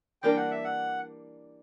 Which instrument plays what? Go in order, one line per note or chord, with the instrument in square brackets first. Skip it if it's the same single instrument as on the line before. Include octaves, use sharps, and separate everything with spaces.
[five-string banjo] E3 G3 A#3 D4 A#4 [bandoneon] G5
[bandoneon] F#5
E5
F#5